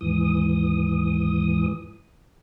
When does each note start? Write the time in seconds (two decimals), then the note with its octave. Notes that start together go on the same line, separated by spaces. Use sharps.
0.01 D#2 G#2 E3 D#6